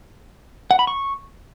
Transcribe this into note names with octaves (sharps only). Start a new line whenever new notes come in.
F#5
B5
C#6